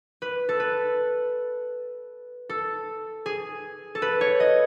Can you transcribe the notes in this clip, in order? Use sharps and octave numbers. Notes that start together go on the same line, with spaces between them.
B4
A4
B4
A4
G#4
A4
B4
C#5
D#5